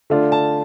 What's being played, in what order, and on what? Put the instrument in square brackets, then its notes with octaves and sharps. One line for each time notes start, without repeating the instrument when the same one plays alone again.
[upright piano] D3 A3 D4 F4
A5